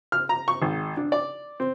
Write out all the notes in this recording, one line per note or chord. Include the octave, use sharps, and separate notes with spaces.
F6
A#5
C#6
G#1
D4
D5
C4